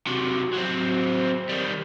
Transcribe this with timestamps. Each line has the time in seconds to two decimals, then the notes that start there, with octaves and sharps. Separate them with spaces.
0.07 C3 F#3
0.54 F#3 C4
1.49 D#3 G3